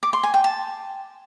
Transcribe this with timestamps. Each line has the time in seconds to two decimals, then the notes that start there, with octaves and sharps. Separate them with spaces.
0.03 D6
0.13 C6
0.23 G#5
0.34 G5
0.44 A5